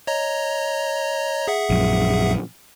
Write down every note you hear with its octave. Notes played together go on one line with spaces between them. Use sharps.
C#5 D#5 A#5
G#4 E5 F#5
A#1 F#2